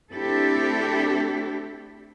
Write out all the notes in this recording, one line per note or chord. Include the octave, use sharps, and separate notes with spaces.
A3 C4 D4 E4 G4 A4